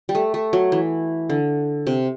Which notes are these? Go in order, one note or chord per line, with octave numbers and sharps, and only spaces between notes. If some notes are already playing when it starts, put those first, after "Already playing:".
G3
A3
A3
F#3
E3
D3
C3